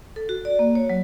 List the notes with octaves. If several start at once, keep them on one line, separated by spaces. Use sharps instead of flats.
A4
F#4
D5
A#3
C#5
F#3